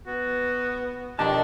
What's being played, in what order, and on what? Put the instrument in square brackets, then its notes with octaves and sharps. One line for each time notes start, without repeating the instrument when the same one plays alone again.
[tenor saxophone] B3 [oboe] F#4
[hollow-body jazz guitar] B1 F2 A5 [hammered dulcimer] D#3 D#4 [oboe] D4 [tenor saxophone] G4